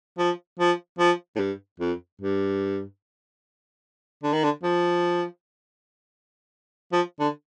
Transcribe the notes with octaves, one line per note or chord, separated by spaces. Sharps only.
F3
F3
F3
A2
G2
F2
G2
D3
D#3
D3
F3
F3
D3